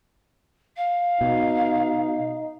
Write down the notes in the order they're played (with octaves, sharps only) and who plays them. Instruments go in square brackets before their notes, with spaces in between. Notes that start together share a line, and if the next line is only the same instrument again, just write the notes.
[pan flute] F5
[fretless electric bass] B2 [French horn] D#4